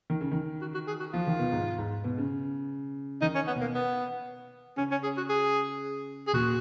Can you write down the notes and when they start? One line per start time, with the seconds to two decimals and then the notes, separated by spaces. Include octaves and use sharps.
0.10 D#3
0.21 C#3
0.32 D#3
0.61 F#4
0.74 F#4
0.87 G#4
1.00 F#4
1.13 F3 F4
1.27 D#3
1.39 B2
1.52 G#2
1.78 G#2
2.04 B2
2.18 C#3
3.21 D#3 D#4
3.35 C#4
3.47 B3
3.56 B2
3.61 A#3
3.74 B3
4.77 C#3 C#4
4.91 C#4
5.03 G#4
5.17 F#4
5.29 G#4
6.27 G#4
6.33 A#2 F#4